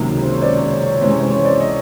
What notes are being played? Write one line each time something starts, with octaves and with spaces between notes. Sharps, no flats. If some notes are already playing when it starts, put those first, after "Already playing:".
Already playing: C#2 C3 D#3 F#3 A#3
C5
C#5
C5 D5
C#5
C#5
C3 E3 G#3 C#4 C5
C#5
C5
C#5
C5 D5
C#5 D#5